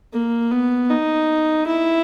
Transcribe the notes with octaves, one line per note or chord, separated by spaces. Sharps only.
A#3
B3
D#4
E4